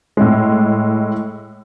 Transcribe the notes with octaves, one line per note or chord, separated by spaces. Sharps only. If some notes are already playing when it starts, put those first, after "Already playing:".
A2 G#3